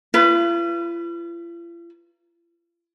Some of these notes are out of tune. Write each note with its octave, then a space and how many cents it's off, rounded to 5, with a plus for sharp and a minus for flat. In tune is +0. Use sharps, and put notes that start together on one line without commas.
F4 -45 B4 +10